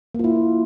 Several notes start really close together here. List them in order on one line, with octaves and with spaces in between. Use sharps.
A#3 F4 E4